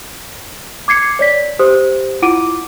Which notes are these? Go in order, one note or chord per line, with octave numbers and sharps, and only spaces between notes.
D6 G#6 C7 C#7
C#5 D5 B6
G4 C5 D#6
E4 F4 F#5 D6 D7 D#7